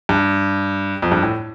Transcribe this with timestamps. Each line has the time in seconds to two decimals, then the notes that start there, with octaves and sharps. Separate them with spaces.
0.09 G2
1.02 F2
1.12 G2
1.23 A2